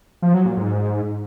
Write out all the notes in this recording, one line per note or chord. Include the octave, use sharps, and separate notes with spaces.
F3
F#3
A#2
G#2